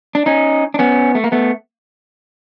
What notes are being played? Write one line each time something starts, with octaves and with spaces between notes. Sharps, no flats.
D4
C#4 D#4
D4
B3 C#4
A3
A#3
A3 B3